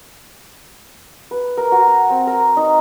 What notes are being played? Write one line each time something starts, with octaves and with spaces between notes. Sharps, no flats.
B4
A#4
F#4
A#5
C4
A#4
D#4